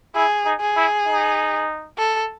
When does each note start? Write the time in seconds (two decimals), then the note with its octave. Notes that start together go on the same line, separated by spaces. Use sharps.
0.15 E4 G#4
0.45 D#4
0.61 G#4
0.76 E4
1.06 D#4
1.98 A4